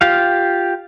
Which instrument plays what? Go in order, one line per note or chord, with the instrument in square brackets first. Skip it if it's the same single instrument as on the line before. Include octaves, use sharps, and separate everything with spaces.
[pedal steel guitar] F4 G4 F5